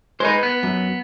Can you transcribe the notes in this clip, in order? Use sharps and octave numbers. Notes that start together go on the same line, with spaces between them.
G#3 D#4 B4 C5
B3
F#2